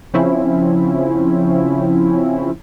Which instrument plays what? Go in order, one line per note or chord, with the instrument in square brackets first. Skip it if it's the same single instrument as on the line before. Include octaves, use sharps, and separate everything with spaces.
[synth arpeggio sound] C#3 F3 C4 C#4 E4